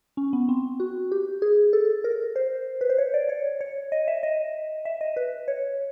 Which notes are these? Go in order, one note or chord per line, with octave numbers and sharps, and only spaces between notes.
C#4
B3
C4
F#4
G4
G#4
A4
A#4
C5
B4
C5
C#5
D5
C#5
C#5
D#5
E5
D#5
E5
D#5
B4
C#5